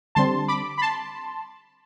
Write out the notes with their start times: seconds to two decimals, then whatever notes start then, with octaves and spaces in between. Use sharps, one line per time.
0.15 D3 G3 C4 A5 C6
0.48 B5 D6
0.78 B5
0.82 A5 C6